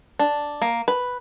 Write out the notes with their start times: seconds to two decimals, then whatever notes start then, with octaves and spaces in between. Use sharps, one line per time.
0.19 D4
0.62 A#3
0.88 B4